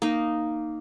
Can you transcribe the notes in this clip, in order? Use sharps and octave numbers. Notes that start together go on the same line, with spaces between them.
A#3 D#4